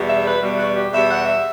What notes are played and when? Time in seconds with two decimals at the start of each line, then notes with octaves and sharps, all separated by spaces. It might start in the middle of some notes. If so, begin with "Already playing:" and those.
Already playing: E2 B2 G3
0.09 E5
0.25 B4
0.42 E2 B2 G3
0.58 F#4
0.75 G4
0.91 E2 B2 G3 E5
1.09 F#5
1.25 E5